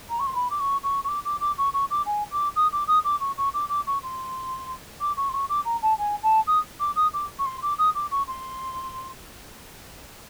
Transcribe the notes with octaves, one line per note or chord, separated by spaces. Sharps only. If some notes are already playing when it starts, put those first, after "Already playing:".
A#5
C#6
C6
B5
D6
C#6
C#6
C#6
D6
D6
D6
C#6
C#6
D6
G#5
D6
D#6
D6
D#6
D6
C#6
C#6
D6
D6
C#6
C6
D6
C#6
C6
C#6
D6
A#5
A5
G#5
A5
D#6
D6
D#6
D6
C#6
C6
D6
D#6
D6
C#6
C6